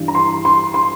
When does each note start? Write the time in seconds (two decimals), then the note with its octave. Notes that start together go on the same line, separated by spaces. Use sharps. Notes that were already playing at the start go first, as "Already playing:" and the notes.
Already playing: G2 E3
0.08 A#5
0.15 C6
0.45 C6
0.74 C6